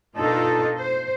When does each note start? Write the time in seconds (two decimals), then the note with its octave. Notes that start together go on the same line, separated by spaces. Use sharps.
0.16 B2 D4 D#4 F4 A4 A#4
0.76 C5